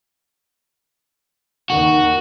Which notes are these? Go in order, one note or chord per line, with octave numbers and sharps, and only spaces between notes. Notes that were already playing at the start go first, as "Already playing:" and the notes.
D#2 D#3 F#4